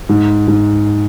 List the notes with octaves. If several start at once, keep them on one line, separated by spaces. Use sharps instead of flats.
G#2
G#2